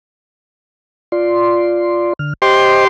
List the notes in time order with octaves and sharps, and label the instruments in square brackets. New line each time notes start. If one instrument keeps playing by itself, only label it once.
[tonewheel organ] F4 D5 C6
D3 F6
[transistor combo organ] G4 C6 [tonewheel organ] C5 D#5